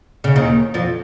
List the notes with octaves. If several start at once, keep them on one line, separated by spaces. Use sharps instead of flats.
C#3
D#2 D#3
F2 F3